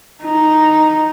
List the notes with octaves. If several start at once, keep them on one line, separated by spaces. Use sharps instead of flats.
D#4